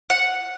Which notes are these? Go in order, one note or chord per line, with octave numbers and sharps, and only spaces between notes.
F#5